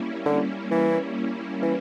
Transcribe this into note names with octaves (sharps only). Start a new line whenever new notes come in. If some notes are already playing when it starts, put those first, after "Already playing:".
Already playing: G3 A#3 C#4 E4
D3
E3
E3